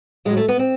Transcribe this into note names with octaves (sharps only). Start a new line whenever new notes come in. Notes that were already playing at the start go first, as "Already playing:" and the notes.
A2 F#3 G#3
A3
B3
C4